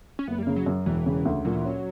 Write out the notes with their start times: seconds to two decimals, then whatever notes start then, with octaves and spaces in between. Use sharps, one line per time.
0.19 C#4
0.28 F#1 B3
0.39 G3
0.43 C#3 A#3
0.56 F#3
0.66 F#2
0.86 E1 E3
1.06 C#3
1.25 D2
1.45 A#2 F#3
1.56 E3
1.65 F#3 C#4